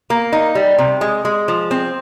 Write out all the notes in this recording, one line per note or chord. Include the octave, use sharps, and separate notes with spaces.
A#3
D#4
G3
C3
G#3
G#3
F3
C4